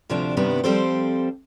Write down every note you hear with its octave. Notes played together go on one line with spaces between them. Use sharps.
D2 C3 F3 D4
G2 C3 D#3 G3 B3 D4
F3 G3 C4 A4 C5